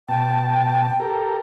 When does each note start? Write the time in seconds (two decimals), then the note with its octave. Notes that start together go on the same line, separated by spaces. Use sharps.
0.09 B2 G5 A5
1.00 G4 A4 A#4